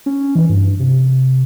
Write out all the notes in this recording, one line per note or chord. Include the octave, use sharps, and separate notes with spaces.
C#4
E3
G2
C3